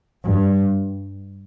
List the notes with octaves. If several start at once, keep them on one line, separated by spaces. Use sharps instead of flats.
G2